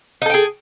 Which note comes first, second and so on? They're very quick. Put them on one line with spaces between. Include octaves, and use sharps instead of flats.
D#4 A4 G5 G#4